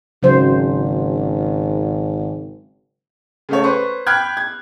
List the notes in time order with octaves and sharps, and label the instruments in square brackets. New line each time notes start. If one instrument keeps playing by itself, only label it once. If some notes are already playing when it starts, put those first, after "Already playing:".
[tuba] G#1 [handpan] C#3 F#3 C5
[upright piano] C#3 A3 C#5
B4 C5 C#6
G5 B5 F6 F#6 G#6
G#6